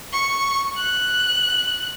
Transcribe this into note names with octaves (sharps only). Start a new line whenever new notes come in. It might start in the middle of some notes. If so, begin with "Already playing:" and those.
C#6
F#6